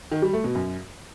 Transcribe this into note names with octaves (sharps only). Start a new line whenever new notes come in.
D#3
G3
A3
B2
F#2